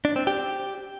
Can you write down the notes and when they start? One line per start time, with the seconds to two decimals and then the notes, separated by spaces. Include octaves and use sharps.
0.05 D4
0.16 C4
0.27 G4